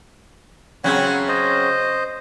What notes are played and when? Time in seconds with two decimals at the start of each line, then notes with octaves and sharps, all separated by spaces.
0.84 C#3 F#3 C4 C#5 F#5
1.28 C5 D#5